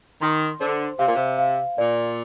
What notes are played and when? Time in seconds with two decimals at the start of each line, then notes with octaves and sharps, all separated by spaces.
0.21 D#3 C6
0.60 D3 C5
0.99 C3 F5
1.07 A#2
1.15 C3
1.39 F5
1.78 A#2 D5